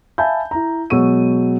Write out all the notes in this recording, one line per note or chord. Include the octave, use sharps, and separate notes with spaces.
E5 F5 G#5 A5 B5 G6
E4 A#5
B2 F#3 G#3 C#6 E6 D#7